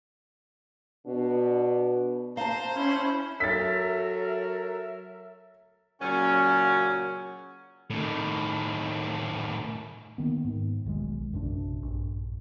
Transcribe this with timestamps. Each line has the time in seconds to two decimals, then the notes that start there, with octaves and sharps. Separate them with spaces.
1.06 B2 D4
2.37 C5 F5 A5 A#5 C6
2.76 C#4 E4
3.40 F#3 A4 A#4 E5 A6 B6
6.01 A#2 C#3 F#3 C#4
7.90 A2 D#3
10.18 D#3 A#3 B3
10.45 G#2
10.85 E1 B1 D#3 G#3
11.32 A#1 F#2 C3 D4
11.83 A#1 G2